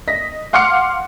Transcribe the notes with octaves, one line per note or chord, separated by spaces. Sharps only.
D#5 A#6 B6
F5 F#5 C6 D6 F6 C#7